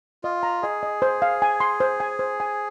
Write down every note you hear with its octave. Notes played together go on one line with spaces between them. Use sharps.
F4 D#5
A#5
G#4 D#5
D#5
C5
F5
G#5
C6
C5
G#5
C5
G#5